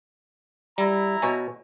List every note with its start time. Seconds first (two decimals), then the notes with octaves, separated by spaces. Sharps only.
0.78 G3 E4 A#5
1.22 B2 C#5 G#5